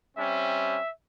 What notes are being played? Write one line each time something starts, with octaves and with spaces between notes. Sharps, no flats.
G3 C4 C#4 E5